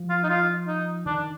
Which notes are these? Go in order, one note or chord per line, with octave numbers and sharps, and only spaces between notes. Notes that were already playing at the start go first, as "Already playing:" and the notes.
Already playing: F3
F4
D#4
F4
D#4
D#3 D4